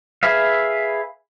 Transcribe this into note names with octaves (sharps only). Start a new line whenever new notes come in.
G#4 B4 E5 F5